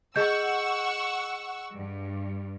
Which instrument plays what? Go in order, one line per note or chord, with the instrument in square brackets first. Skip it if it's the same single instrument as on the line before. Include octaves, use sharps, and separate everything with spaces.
[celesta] G#4 D#5 G6 [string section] F#5 C#6 E6
[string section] G2